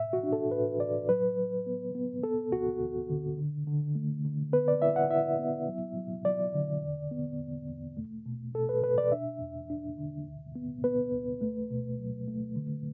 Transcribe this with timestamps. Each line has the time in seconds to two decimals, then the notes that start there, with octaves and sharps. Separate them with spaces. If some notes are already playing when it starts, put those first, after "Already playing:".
Already playing: A2 E5
0.13 F#4
0.23 D4
0.33 A4
0.51 A2 B4
0.80 A2 D5
1.09 F#3 B4
1.38 F#3
1.66 B3
1.95 B3
2.23 B3 A4
2.52 D2 F#4
2.81 D2
3.10 D3
3.38 D3
3.67 D3
3.95 A3
4.24 D3
4.53 B3 B4
4.68 D5
4.82 E4 E5
4.96 F#5
5.10 E4 E5
5.39 B3
5.68 F#3
5.96 F#3
6.25 F#3 D5
6.54 D3
6.82 E2
7.11 B3
7.40 E2
7.69 E2
7.97 A3
8.26 B2
8.54 B2 A4
8.69 B4
8.83 B2 B4
8.98 D5
9.12 D4 E5
9.41 E2
9.70 D4
9.98 D3
10.27 D2
10.56 B3
10.84 B3 B4
11.13 D2
11.41 A3
11.71 B2
11.99 F#3
12.28 A3
12.56 D3